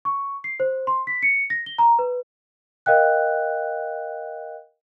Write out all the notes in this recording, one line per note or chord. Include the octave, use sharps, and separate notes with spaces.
C#6
C7
C5
C6
B6
C#7
A#6
G7
A#5
B4
A#4 D#5 F5 G5 F#6